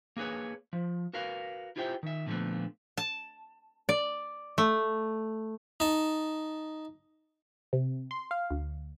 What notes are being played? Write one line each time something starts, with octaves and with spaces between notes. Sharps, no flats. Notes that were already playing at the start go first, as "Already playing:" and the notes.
A#3 G#4 B4 C#5
F3
F#4 A#4 B4 F5
E4 F4 G4 C5 E5 G5
D#3 E5
A#2 D3 F3 G#3 A3 B3
A5
D5
A3
D#4 A5
C3
C6
F5
D2